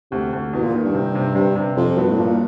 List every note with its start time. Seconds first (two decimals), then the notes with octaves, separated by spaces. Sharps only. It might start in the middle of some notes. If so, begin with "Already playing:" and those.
0.11 D2 C3
0.33 D2
0.53 E2 B2
0.63 A#2
0.74 D#3
0.85 G2
0.94 C3
1.15 C3
1.35 G2 C3
1.56 C3
1.76 F2 F3
1.97 G2 B2
2.10 A2
2.17 A#2 F3